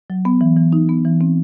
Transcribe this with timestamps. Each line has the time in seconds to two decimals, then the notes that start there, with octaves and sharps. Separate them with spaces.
0.10 F#3
0.25 B3
0.41 E3
0.57 E3
0.72 D#4
0.89 B3
1.05 E3
1.21 C4